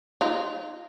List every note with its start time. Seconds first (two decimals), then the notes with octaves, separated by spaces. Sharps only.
0.21 D#4 F4